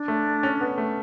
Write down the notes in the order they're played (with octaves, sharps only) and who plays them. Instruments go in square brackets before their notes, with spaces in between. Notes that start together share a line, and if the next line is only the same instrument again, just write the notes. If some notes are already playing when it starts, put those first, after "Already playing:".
Already playing: [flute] D4
[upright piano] A3
C#4
B3
A3